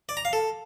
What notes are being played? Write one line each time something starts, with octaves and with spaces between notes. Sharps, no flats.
D5
A#5
F5
A4